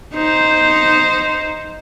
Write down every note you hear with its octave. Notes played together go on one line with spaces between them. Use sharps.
D#4 C5